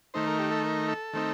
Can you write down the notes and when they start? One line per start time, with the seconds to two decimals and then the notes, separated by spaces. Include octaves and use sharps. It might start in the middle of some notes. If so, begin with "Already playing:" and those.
0.14 D#3 A3 D#4 C5
0.27 A#4
0.39 G4
0.51 A4
0.64 A#4
0.88 A4
1.13 D#3 A3 C4 D#4